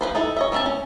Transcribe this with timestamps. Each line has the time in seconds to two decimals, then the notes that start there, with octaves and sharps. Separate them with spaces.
0.01 F3 A#3 B4 C5
0.15 D#4 E4 A4
0.37 C#5 D#5 E5
0.52 A3 C4 D#4 E5 A5
0.66 C#4